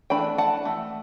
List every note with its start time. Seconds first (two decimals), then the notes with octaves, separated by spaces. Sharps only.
0.10 E3 A3 D4 G5 B5
0.38 F#5 A5
0.65 E3 A3